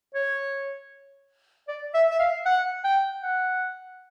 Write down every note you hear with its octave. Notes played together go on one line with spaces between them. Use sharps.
C#5
D5
E5
E5
F5
F#5
G5
F#5